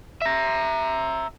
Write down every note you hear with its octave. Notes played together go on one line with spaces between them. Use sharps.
E5 A#5